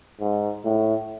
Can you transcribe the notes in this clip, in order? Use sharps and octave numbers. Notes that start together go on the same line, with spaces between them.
G#2
A2